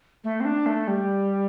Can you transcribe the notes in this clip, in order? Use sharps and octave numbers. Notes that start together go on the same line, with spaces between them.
A3
C4
D4
A3
G3